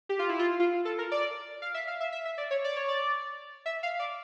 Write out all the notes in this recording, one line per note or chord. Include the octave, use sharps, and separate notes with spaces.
G4
F4
E4
F4
F4
A4
A#4
D5
F5
E5
F5
E5
E5
E5
D5
C#5
D5
C#5
D5
E5
F5
D5